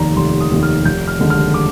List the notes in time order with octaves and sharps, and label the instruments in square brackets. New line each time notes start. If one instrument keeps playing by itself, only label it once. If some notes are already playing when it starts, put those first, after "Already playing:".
Already playing: [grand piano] F1 D#2 D#3 D5 A#5
F1 C6
D#6
D#2 D#3
F6
F1 G6
F6
D#2 D3 G#3
F6
D6